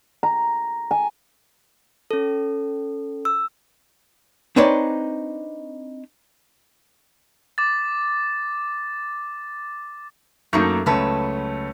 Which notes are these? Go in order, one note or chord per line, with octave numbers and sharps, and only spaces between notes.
A#5
G#5
C#4 A4
E6
C4 D4 D#4 B4 C#5 D5
D6 A6
F#2 A3 A#3 D#4 A4
C#2 F#2 A3 C#4 B4 A5